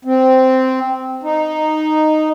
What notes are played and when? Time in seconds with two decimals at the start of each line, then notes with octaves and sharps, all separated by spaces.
0.05 C4
1.23 D#4